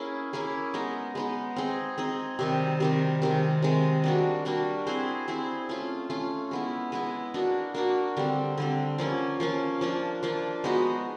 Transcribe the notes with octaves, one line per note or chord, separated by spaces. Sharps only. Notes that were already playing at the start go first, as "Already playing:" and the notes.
Already playing: A#3 C#4 E4 G#4
A#3 C#4 E4 G#4
G#3 B3 D#4
G#3 B3 D#4
C4 D#4 G#4
C4 D#4 G#4
C3 D#3 G3
C3 D#3 G3
C3 D#3 G#3
C3 D#3 G#3
G3 A#3 D4 F#4
G3 A#3 D4 F#4
C4 E4 G#4 C5
C4 E4 G#4 C5
A3 C#4 F4
A3 C#4 F4
G#3 B3 E4
G#3 B3 E4
A#3 D4 F#4
A#3 D4 F#4
D3 G3 C4
D3 G3 C4
F3 A#3 C#4
F3 A#3 C#4
F3 A#3 D4
F3 A#3 D4
G#3 B3 D#4 F#4